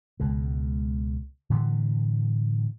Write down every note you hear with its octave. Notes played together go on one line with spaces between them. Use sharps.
C#2 B2 G#3
A2 D3 E3 G3